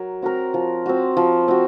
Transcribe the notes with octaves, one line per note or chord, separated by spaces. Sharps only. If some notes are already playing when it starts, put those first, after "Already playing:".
Already playing: F#3 A#4
C4 F#4 A#4
F3
C4 F#4
F3
C4 F#4